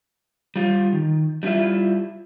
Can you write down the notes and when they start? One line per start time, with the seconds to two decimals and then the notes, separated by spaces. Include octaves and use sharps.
0.56 G3 F4
0.93 D#3
1.43 G3 D4 E4 F4 E5